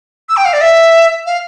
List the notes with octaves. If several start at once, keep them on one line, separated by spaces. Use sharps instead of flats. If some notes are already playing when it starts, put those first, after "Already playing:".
E6
G5
F5
D5
E5
F5